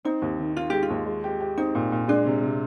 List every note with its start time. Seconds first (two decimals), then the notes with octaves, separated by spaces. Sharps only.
0.05 C4 D#4
0.22 D#2
0.40 D#3
0.57 D#3 F4
0.70 G#3 G4
0.83 F4
0.90 D#2
1.06 G#3
1.24 G4
1.40 G4
1.58 C4 D#4
1.75 A#2
1.92 A#2
2.08 G#3 D4
2.26 C3
2.43 C3